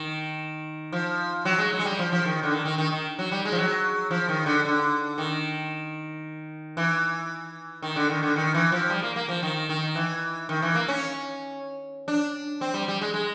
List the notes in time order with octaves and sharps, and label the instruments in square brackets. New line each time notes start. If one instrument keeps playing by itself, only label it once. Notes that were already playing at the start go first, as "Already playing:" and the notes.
Already playing: [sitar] D#3
F3
F#3
G#3
F#3
G#3
G3
F3
F3
D#3
D3
D#3
D#3
D#3
D#3
F#3
G3
G#3
F3
F#3
F3
D#3
D3
D3
D#3
E3
D#3
D3
D#3
D3
D#3
E3
F3
G3
A#3
A#3
F3
D#3
D#3
E3
D#3
E3
A#3
C#4
D4
C4
G3
G3
G#3
G#3